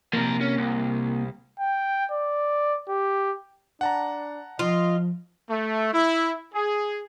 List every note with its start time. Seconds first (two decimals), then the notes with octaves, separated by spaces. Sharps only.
0.13 C3 F3 A#3 A#4
0.41 C#4
0.57 C2
1.59 G5
2.11 D5
2.89 G4
3.81 D4 F#5 A5 A#5
4.59 F3 F4 D#5
5.49 A3
5.93 E4
6.54 G#4